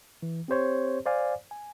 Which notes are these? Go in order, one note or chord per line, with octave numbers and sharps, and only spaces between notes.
E3
C4 G4 C5 C#5
C5 D5 F5 G#5
G#5